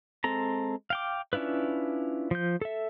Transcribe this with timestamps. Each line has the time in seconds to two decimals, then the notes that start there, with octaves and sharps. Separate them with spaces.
0.24 G#3 C4 A4 A#5
0.90 F5 G5 D6
1.33 C#4 D4 E4 F4 B4
2.31 F3 G6
2.61 A4 E5